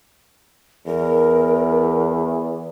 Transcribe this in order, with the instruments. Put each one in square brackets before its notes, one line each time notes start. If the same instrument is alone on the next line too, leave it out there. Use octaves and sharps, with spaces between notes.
[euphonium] E2 [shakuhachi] A#4